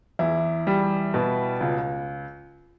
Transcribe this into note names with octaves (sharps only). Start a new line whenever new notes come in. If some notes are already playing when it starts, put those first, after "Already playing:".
E2 E4
G3
B2
C#2